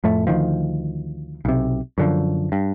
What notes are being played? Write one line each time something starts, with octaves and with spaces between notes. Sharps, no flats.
F2 A2 A3
D2 D#3 F3
B1 C3
F#2 D3 F3
G2